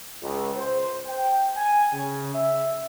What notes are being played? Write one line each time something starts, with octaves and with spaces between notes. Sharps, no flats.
C#2
C5
G5
G#5
C#3
E5